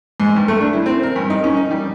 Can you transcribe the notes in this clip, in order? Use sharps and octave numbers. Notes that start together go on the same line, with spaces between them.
G#2
G2
A3
D4
E4
C4
A#4
G2
D#4
C#4
D#4
G3